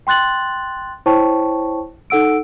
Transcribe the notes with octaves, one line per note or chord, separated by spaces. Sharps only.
G5 C6 F#6 A6 F#7
E4 C5 C#5 G5 A5 C#6
D#4 A4 F#5 E6 D7